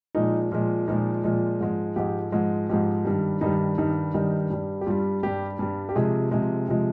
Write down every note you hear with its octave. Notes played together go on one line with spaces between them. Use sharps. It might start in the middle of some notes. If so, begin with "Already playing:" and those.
A#2 F3 G#3 D#4
A#2 F3 G#3
A#2 F3 G#3 D#4
A#2 F3 G#3
G#2 F3 G#3
G#2 F3 G#3 G4
G#2 F3 G#3
G#2 F3 G#3 G4
G2 D#3 G3
G2 D#3 G3 D#4
G2 D#3 G3 D#4
G2 D#3 G3 D#4
G2 G3
G4
G2 G3 F4
G2 G3 G4
G2 G3
G4
C3 F3 G#3 G#4
C3 F3 G#3
C3 F3 G#3